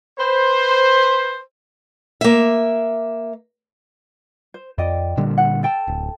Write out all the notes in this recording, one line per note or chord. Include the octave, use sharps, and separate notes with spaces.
B4 C5
A#3 E5
C5
F2 D5 D#5 G5
A#2 D3 G3
F#5
A4 G5 A5
D1